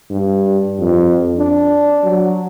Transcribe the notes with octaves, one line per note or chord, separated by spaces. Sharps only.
G2
F2
D4
F#3